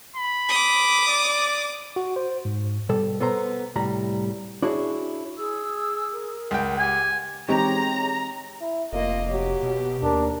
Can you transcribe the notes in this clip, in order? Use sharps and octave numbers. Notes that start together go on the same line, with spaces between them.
B5
D6 D#6
D5
F#4
C5
G#2
B2 G3 A4
B3 A4 C5 A#5
C2 A2 G3 A#5
D4 E4 F#4 G#4 C#5
G#4 E6
A#4
C#2 F#5 G5
G4 G#5
E3 G#3 C4 D#4 G4 C#5 A#5
E4
F1 A#3 F4 D#5
F#3 G4
B2
D#2 D4 A#4